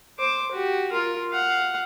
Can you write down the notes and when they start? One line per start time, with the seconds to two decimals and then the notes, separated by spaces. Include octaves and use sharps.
0.19 C5 D6
0.52 F#4 G4
0.92 F4 A#4
1.31 F5 F#5